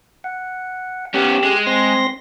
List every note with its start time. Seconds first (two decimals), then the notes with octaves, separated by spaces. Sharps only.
0.24 F#5
1.14 B3 C#4 G4 E6
1.44 G#3
1.67 C4 C6 A#6